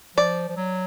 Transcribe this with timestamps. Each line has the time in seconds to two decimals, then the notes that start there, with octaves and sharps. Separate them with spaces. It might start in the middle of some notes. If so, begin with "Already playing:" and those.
0.17 F3 D5
0.49 F3
0.57 F#3